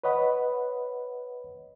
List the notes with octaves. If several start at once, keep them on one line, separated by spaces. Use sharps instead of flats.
B4 C#5 D#5 F#5 B5